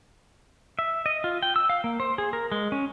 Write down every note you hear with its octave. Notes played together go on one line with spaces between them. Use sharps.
E5
D#5
F4
G5
E6
F5
A#3
C5
G#4
A#4
G#3
C#4